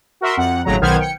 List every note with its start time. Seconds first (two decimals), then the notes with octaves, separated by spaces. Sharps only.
0.21 F#4 A#4 E5 C6
0.37 F2 F#5
0.65 G#1 A2 C#3 F#3 A#5
0.81 B1 D#3 B3 C5 F6 G#6
0.99 G5 C#7